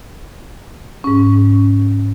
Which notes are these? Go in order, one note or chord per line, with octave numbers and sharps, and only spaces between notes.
G#2 C#4